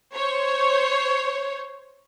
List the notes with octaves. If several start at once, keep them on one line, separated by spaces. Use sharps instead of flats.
C5 C#5